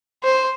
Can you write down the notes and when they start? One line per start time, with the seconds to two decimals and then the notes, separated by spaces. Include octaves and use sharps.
0.24 C5